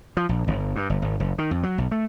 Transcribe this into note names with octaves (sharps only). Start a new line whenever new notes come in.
F3
A#1
G1
G2
G1
G#1
F#1
D#3
F2
F#3
B1
A3